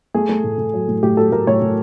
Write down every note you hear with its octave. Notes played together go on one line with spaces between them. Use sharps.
A3 G#4
A3
A2
A2
F#3
A2
A2 G4
F#3 A4
A2 A#4
A2 C#5
A2